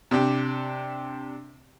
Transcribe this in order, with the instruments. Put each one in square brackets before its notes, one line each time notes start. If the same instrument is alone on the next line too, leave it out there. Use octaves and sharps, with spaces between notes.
[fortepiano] C3 D4 G4